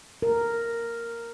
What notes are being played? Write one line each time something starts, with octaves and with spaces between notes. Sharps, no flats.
A#4